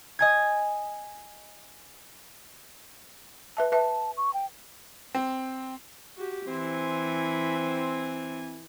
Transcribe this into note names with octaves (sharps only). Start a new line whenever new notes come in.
D#5 G#5 G#6
B4 E5 A5
B4 E5 A5
C#6
G5
C4
F#4 G4
E3 C4 G#5